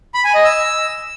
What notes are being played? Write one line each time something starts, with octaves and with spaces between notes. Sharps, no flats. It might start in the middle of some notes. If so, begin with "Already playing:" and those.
B5
G#5
D#5
E6